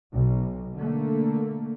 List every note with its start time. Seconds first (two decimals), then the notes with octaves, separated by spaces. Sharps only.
0.12 B1
0.76 D3 A3 A#3